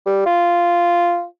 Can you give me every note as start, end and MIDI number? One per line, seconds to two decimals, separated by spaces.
0.06 0.23 55
0.26 1.24 65